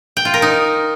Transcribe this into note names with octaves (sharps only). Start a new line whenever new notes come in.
G5
F4
A#4
D#4